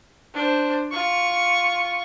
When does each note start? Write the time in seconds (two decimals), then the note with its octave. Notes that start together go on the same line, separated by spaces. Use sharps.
0.34 D4 C5
0.92 F4 C#6